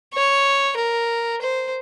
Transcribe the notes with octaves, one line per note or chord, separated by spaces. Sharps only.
C#5
A#4
C5